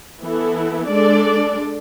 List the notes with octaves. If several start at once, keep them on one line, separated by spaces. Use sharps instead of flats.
E3 B3 E4 A4
G#3 D4 A4 D5